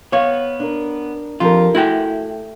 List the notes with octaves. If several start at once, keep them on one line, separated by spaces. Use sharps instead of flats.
B3 C#5 F5
D4 A#4
F2 D3 F4 G4 A#4
A3 E4 F#4 G5